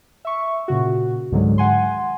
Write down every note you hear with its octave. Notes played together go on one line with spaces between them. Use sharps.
E5 C#6
A#2 C#3 F#4
C#2 G#2 D3 D#3 F#3 G#3
F#5 G#5 C6